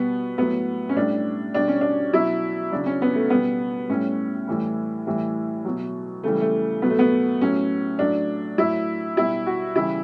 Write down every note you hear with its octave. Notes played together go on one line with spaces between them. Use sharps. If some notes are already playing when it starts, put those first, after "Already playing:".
Already playing: B2 G3 B3
A2 F#3 B3
C#4
A2 G3 D4
B2 G3 D4
C#4
D4
B2 F#3 E4
C#3 F#3 D4
C#4
B3
A3
B2 G3 B3
A2 G3 C#4
A2 E3 G3
A2 E3 G3
B2 F#3
C#3 E3 G3 A3
A3
B2 F#3 B3
A3
B3
A2 F#3 C#4
A2 F#3 D4
A2 F#3 E4
B2 G3 E4
F#4
C#3 E3 G3 E4